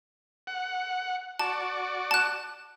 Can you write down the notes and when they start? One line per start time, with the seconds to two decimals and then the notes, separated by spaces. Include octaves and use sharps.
0.47 F#5
1.39 F#4 D5 A5
2.11 A5 F#6